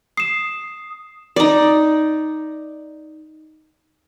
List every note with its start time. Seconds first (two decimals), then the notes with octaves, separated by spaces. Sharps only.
0.17 D#6 C7 E7
1.36 D#4 D5